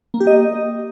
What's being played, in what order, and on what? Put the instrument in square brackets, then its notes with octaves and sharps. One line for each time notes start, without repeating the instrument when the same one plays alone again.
[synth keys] A#3
G4
D#5